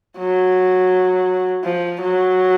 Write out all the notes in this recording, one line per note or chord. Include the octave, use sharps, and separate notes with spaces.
F#3
F3
F#3